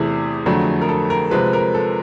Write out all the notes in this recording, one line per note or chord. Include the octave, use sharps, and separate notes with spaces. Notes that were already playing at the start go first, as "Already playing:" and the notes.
Already playing: E2 C3 E3 A3 G4 G#4
F2 D3 F#3 A3
A#4
A4
A#4
C3 F3 G#3 B4
A#4
A4